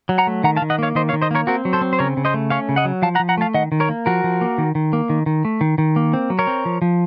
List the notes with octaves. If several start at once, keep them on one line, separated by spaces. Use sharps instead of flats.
F#3
F#5 A#5
A3
D#3 F#5 A#5
F5 A5
D#3
D#5 F#5
A#3 C#5 F5
D#3 C5 D#5
C#5 F5
D#3
C5 D#5
A#3 A#4 C#5
C4 F#4 A#4
F#3
A4 C5
C4
C5
C#3 A#4 C#5
C#3
C5 D#5
A3
C#4 C#5 F5
C#3
D#5 F#5
F#3
F3 F5 A5
F#5 A#5
F3
F#5 A#5
A3 F5 A5
D#3 D#5 F#5
D#3
A#4 C#5
A#3
F3 F#4 A#4
F3
A#3
D#3
D#3
A#3
D#3
D#3
A3
D#3
D#3
A#3
C4
F#3
A#4 C#5
C4
F3
F3